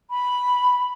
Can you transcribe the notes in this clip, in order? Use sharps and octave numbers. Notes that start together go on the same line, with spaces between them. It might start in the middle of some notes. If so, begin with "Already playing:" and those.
B5